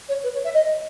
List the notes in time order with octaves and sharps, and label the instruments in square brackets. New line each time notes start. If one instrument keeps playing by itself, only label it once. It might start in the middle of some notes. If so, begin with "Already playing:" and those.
[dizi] C#5
B4
C#5
E5
D#5